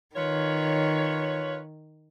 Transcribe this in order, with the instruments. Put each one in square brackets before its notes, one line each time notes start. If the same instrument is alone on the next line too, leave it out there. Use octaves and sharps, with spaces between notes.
[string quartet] D#3 [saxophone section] F4 B4 C#5